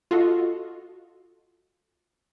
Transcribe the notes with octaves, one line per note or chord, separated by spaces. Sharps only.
F4 F#4 A4 D#5